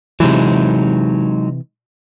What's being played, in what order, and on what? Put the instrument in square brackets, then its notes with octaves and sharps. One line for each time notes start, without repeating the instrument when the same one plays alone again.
[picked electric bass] C3 E3 [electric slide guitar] F#3 G#3 D#4